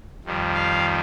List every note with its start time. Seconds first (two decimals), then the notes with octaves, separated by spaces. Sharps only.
0.25 F2 D#3 G3
0.54 F5